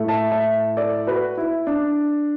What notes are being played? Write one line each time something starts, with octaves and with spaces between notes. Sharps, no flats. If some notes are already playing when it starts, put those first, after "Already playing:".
Already playing: A2 A3
E5 A5
E5 A5
A4 D5
F#4 B4
E4
D4